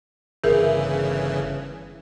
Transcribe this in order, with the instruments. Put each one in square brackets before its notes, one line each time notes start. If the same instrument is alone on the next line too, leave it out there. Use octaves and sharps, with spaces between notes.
[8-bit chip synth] G1 C#3 E3 [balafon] G#4 A#4 E5